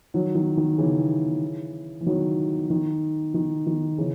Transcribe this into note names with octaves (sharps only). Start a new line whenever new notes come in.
D#3 F#3
D#3
D#3
C#3 E3
E3
D#3 F#3
D#3
D#3
D#3
C#3 E3